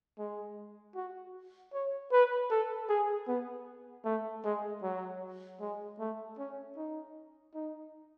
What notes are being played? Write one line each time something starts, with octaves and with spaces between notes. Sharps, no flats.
G#3
F#4
C#5
B4
A4
G#4
B3
A3
G#3
F#3
G#3
A3
C#4
D#4
D#4